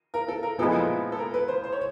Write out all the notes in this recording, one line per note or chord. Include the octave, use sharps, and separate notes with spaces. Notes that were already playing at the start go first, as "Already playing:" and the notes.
A#4
A4
A#4
A#2 F3 G#3 B3 E4 A4
A4
A#4
B4
C5
C5
C#5